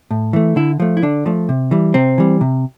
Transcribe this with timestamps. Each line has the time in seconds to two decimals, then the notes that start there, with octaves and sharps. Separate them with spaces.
0.11 A2
0.33 E3 A3
0.56 D3 E4
0.80 F3 A3
0.97 E4
1.02 D3 D4
1.26 F3 A3
1.49 C3
1.71 E3 G3
1.94 C3 C4
2.18 E3 G3
2.41 C3